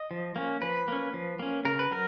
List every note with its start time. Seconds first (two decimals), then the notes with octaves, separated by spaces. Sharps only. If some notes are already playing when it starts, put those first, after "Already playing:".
Already playing: D#5
0.11 F3
0.36 A#3 C#4
0.62 F3 B4
0.88 A#3 C#4
1.14 F3
1.39 A#3 C#4
1.65 C#3 A#4
1.79 B4
1.91 F#3 A#4